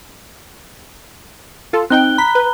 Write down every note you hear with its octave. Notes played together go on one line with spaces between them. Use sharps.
F4 A4
C4 D#4 G5 F#6 G7
A#5 B5 B6
B4